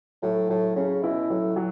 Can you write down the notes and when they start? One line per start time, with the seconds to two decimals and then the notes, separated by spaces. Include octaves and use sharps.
0.22 A2 F#3
0.49 A2 F#3
0.76 C#3 C#4
1.03 B2 E4
1.30 A2 F#3
1.56 F#3